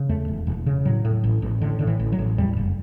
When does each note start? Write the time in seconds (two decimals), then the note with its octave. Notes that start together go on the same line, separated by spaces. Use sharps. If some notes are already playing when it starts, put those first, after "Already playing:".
Already playing: C#3
0.09 E2 A3
0.28 E1
0.47 E1
0.66 C#3
0.85 A2 F#3
1.05 A2
1.24 A1
1.42 A1
1.62 A2 D3
1.79 A2 D3
1.87 E3
2.00 A1
2.12 F#3
2.19 A1
2.38 E2 G3
2.57 F#1